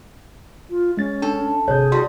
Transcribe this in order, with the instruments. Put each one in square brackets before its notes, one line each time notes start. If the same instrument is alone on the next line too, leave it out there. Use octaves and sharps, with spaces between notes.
[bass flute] F4
[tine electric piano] G#3 A6 [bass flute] C#4
[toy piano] D4 [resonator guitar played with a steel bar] A4
[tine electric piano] G#1 C3 G6 [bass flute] G#4 [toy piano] C#5
[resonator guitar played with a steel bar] G3 [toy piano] E4 C6 [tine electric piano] F#4